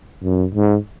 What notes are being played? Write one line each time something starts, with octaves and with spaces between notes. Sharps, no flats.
F#2
G#2